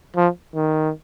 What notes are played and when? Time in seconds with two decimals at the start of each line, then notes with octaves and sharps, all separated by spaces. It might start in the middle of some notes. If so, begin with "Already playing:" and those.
0.16 F3
0.55 D#3